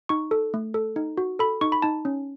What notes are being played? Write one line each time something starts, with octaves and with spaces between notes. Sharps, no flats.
D#4 C#6
A4
A3
A4
D#4
F#4
A4 B5
D#4 C#6
B5
D#4 A5
C#4